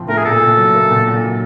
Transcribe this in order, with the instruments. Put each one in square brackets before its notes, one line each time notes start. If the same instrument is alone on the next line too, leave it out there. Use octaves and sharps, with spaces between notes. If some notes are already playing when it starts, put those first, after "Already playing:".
Already playing: [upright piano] A2 F3 C4
[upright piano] A3 [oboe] A#4
[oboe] G#4
[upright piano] A#2 [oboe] A4
[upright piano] A#2
F#3
A#3
A#2
A#2
F#3